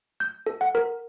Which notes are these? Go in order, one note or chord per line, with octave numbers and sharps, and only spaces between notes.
G6
A4
F#5
A#4